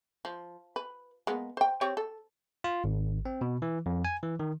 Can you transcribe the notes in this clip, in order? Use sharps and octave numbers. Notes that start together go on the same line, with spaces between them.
F3
B4
G#3 A#3 B3
C5 G5
C4 G4 C#5
A4
F4
G#1
C4
B2
E3
F2
G#5
E3
D#3